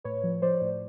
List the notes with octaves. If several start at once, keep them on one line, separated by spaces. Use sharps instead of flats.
A2 B4 C#5
F3
F3 C5 D5
A2